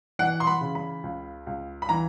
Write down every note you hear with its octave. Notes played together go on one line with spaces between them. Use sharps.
E3 F#5
C6
B5
C#3
B5
C#2
C#2
B5
E3 A#5